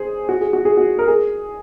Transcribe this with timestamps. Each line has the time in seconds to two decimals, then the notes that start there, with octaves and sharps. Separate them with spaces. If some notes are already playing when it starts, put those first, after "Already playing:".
Already playing: G#4 C5
0.29 F#4
0.41 G#4
0.53 F#4
0.65 G#4
0.77 F#4
0.99 A#4
1.08 G#4